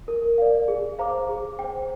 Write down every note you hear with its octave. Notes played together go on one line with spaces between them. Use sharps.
A#4
D5 F5
G#4
C5 F5 A#5 D6
G#4
G5
C5